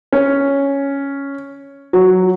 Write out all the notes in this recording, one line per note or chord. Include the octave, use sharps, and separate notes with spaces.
C#4
F#3